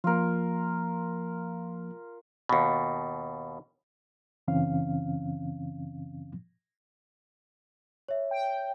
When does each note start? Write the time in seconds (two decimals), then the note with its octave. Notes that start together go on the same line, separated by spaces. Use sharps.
0.04 F3 A#3 F4 A#4
2.49 D#2 B2
4.48 F#2 C#3 E3 C4 C#4 F5
8.08 C#5 E5
8.31 G5